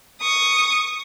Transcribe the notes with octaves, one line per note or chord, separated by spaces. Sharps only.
C#6 D#6